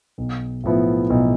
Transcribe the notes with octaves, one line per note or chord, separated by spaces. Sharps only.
B1
A2 F3 B3 E4
B1